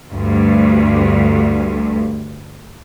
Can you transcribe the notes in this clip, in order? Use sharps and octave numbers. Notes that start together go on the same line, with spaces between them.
D2 G2